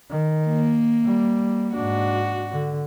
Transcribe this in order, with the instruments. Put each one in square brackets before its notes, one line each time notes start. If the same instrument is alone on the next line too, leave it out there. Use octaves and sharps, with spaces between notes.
[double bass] D#3
[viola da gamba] A#3
[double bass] G3
[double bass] G#2 D4 [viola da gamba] F#4
[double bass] D3